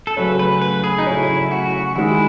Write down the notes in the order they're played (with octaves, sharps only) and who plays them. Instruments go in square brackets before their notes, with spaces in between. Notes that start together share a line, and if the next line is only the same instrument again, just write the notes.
[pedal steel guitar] A4
[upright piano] C#3 F#3 A3 C#4 [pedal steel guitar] B4
[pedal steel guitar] B4
B4
G#4
D#4
[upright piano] C#3 F#3 A3 C#4 [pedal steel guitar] E4
[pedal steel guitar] F#4
[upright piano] D#3 G#3 D#4 [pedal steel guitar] E4